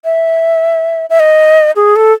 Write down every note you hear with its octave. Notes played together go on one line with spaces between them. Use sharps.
E5
E5
D#5
G#4
A4